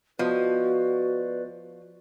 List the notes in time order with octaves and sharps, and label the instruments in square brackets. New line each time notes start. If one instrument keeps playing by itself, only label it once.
[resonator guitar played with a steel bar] F3 [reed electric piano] B3 D#5 [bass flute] F#4 [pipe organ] B4 D5